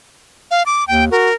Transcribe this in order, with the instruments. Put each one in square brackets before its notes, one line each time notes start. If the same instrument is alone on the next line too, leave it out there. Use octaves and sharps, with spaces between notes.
[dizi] F5
D6
[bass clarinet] D#2 [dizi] G5
[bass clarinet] F#4 [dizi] A#4